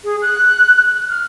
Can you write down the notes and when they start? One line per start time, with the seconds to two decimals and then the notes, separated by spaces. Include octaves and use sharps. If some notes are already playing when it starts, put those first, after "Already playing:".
0.04 G#4
0.22 F#6
1.10 F6